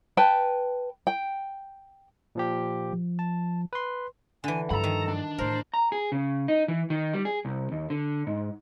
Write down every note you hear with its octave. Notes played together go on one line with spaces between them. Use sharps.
B4 G5 A5
G5
A#2 F3 G4
F3
A5
B4 C6
D3 E3 G#5
G2 F3 A4 A#5 B5
D#3
D4
A2 E3 A#4 C5
A#5
G#4
C#3
D#4
E3
D#3
G3
G#4
C2
D#2
D3
G#2